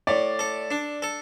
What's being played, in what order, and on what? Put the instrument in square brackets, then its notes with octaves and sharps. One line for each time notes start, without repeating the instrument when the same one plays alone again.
[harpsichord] A2 [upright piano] D5
[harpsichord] A4
D4
A4